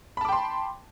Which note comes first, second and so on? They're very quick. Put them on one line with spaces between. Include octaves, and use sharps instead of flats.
B5 A5 D6 G5 C6